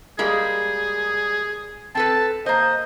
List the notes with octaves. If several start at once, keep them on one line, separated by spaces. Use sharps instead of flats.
G3 G#3 A#3 G#4
C4 A4 B4 A5
A#3 C5 D#5